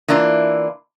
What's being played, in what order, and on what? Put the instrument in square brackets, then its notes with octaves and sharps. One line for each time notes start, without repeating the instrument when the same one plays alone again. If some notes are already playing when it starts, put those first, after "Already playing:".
[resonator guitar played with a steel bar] E3 A#3 D4 E4 F4